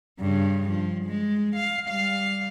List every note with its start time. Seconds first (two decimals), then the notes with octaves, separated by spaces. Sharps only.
0.20 G2 C#3
0.69 F3
1.06 G#3
1.56 F5
1.89 G3 F5